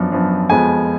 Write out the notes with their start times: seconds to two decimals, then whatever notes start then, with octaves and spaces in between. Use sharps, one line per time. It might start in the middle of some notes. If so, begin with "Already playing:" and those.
Already playing: F#2 F3 B3 D4
0.12 F#2 F3 B3 D4
0.50 F2 F3 G#3 B3 G#5